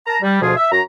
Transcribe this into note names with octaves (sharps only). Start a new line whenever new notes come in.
A#4 A5 A#5
G3
D2 B2 F3 F4 G#4
E5
F#2 F#4 A#5